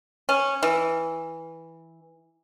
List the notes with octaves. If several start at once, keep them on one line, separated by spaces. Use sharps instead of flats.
C#4
E3